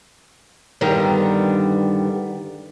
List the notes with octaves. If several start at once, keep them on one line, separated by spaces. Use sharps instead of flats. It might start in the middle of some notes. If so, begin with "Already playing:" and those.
G2 D3 D#3 G3 B3 A#5